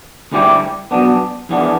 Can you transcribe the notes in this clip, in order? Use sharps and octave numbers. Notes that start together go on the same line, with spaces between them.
D2 D3 G3 E4 G4
B1 B2 B3 D4
E2 E3 B3 D4